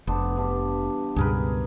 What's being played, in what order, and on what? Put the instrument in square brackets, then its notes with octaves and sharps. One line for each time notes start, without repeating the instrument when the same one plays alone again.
[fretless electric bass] F1 [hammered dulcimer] B3 D4 C5
[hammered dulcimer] G2 E3 D4
[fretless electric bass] C#2 G2 B2 [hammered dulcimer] G#4 A#4 B4